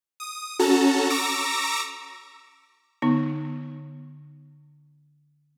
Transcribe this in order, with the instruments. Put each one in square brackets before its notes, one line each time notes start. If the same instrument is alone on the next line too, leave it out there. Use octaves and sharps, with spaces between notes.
[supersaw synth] D#6
C#4 F#4 A4 A5 A#5
A#5 C#6 D6 E6 A#6
[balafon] D3 B3 D#4